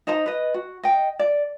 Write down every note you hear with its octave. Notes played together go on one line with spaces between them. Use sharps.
D#4 C5 D#5 A#5
B4 D#5
F#4
D#5 G5
D5